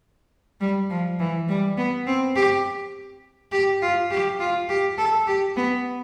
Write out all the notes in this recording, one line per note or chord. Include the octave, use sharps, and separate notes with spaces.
G3
F3
E3
G3
B3
C4
G4
G4
F4
G4
F4
G4
A4
G4
B3